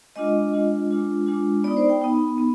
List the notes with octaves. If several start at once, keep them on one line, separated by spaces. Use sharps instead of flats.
G#3 D4 F4 D#5
G#3 D4 F4
G#3 D4 F4
G#3 D4 F4
B3 D#4 D5
C5
G5
B3 D#4
B3